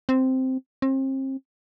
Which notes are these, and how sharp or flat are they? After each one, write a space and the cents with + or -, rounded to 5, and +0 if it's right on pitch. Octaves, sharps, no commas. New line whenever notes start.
C4 -5
C4 +35